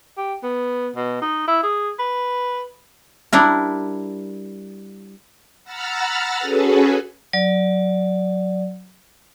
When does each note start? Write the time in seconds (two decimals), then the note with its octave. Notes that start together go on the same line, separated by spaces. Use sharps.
0.17 G4
0.43 B3
0.96 B2
1.22 D#4
1.48 E4
1.63 G#4
1.99 B4
3.33 G3 D4 E4 A#4
5.64 F#5 A#5 B5 E6 F6 A6
6.39 C#4 F#4 G#4 A4 B4
7.33 F#3 D5